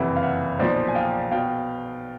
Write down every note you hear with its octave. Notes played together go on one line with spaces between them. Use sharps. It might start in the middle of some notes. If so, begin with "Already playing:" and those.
Already playing: F#1 F2 C3 E3 E5 F#5
F5
E5 F#5
B1 A#2 F3 C5 D5
G#5
F5 G5
B2 F5 G5